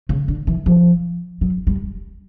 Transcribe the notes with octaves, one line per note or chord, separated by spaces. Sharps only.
C#3
D3
E3
F3
F#3
G3